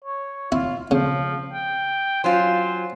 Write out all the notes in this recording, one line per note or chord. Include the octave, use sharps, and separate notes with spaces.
C#5
E4 F4
C#3 F3
G5
F#3 C#4 F4 C5